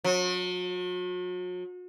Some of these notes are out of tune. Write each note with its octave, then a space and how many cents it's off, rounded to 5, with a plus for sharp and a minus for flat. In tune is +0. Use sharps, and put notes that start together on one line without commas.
F#3 -40